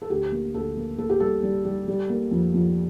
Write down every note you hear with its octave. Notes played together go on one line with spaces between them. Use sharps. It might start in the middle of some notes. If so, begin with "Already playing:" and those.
A4
D2 G4
A#3
D2 A4
A#3
A#3 A4
G4
G3 A4
G3
G3
G3
A#3
F2
F2